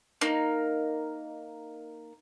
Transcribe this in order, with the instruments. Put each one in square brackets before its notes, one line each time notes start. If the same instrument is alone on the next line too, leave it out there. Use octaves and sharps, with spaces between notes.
[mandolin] A#3 D#4